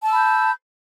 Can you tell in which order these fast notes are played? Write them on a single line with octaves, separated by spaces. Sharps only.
A5 E6 B5 G6